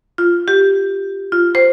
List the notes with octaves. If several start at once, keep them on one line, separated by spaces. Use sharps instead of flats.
F4
G4
F4
C5